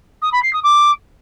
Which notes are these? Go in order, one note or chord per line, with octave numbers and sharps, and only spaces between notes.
D#6
B5
C7
D#6
D6